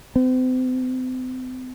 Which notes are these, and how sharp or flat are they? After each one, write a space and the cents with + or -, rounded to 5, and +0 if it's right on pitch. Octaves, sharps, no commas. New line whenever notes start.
C4 -40